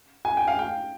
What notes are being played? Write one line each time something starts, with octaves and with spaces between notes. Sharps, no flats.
G#5
G5
F5
G5